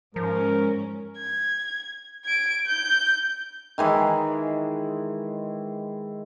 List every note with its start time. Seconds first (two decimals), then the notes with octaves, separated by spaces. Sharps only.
0.16 G#2 F3 C#4 A#4
1.18 G#6
2.25 G#6 D7
2.66 G6
3.78 D#3 E3 G#3 E4